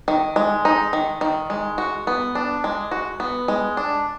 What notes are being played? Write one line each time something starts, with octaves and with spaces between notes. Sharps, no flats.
D#3
G#3
D#4
D#3
D#3
G#3
F#4
B3
D4
G#3
F#4
B3
G#3
D4